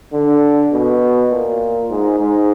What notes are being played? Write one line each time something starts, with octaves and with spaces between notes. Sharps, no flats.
D3
B2
A#2
G#2
G#2